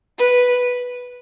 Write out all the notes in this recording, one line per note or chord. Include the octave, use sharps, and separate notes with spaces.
B4